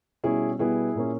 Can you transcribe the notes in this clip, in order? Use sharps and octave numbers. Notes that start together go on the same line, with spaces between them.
B2 G3 C#4 E4 G#4
B2 G3 B3 E4 G#4
A#2 A#3 C#4